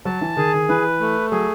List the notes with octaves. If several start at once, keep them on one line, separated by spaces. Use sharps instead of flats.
F#3 A5
E3
D#3 G#4
D#3
E3 B4
A3
F#3 G#4